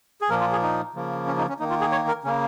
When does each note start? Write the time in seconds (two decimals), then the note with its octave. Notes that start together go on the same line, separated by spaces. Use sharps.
0.21 G#4
0.30 A#2 F3 A#3 A#4
0.41 F4
0.52 G#4
0.62 D#4
0.94 C#3 F3 A#3
1.27 C#4
1.38 D#4
1.49 C#4
1.59 D#3 A#3 D#4
1.70 F4
1.81 G#4
1.92 C#5
2.08 A#4
2.24 C#3 C#4
2.27 A#3